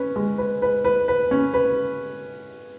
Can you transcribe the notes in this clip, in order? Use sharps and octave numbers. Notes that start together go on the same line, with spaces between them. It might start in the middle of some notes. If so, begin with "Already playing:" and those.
Already playing: C#4 B4
G#3
B4
B4
B4
B4
C#4
B4